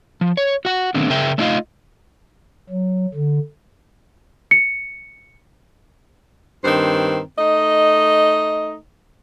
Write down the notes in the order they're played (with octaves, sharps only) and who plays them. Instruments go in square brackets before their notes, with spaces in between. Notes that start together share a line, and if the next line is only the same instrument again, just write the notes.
[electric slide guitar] F3
C#5
F#4 F#5
D#3 A3 B3 C4 D4
C#3 G#4 A#4 E5 G5
A3 D4 D#4 F4 D#5 F5
[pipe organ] F#3
D3
[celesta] C#7
[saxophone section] G2 D#3 C4 C5
A3 D#4 D#5